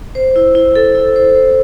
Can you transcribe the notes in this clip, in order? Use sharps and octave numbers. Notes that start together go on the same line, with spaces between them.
C5
E4
E4
A4
E4
C5
C5